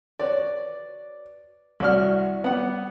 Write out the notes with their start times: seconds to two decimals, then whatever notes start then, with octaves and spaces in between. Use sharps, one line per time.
0.19 F#4 B4 C#5 D5
1.80 C2 E4 F#4 A4 D5 F6
2.44 G3 B3 F#5 B5